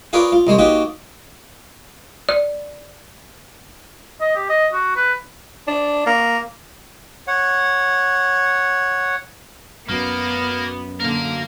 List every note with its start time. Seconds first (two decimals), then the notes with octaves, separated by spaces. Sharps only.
0.13 F4 G#4 A#4 B4 C#5 D5
0.32 F4
0.47 C2 G#3 C5 C#5
0.59 A#3 D#4 F#4 G4 C#5
2.29 D5
4.20 D#5
4.36 G4
4.49 D#5
4.73 F#4
4.96 B4
5.67 D4
6.06 A#3
7.27 C#5 F#5
9.89 F#2 A#3 B3
11.00 D3 A#3 A#4 F5